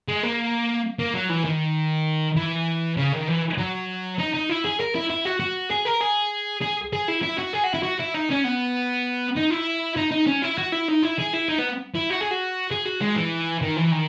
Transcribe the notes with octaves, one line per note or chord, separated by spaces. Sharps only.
G#3
A#3
A#3
F#3
E3
D#3
E3
C#3
D#3
E3
F#3
D#4
D#4
E4
G#4
A#4
E4
E4
F#4
F#4
G#4
A#4
G#4
G#4
G#4
E4
E4
F#4
G#4
F#4
E4
F#4
E4
D#4
C#4
B3
D#4
E4
D#4
D#4
C#4
E4
F#4
E4
D#4
E4
G#4
E4
D#4
B3
E4
F#4
G#4
F#4
G#4
F#4
G#3
E3
D#3
E3
D#3